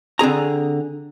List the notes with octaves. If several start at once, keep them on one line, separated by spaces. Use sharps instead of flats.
D3 C4 G#4 A#5